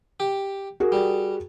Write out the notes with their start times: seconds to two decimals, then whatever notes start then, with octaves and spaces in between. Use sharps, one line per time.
0.20 G4
0.80 F#4 G#4 A#4
0.92 G3